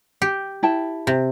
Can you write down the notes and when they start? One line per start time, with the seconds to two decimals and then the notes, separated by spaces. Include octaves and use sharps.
0.22 G4
0.63 E4 G5 A5
1.07 C3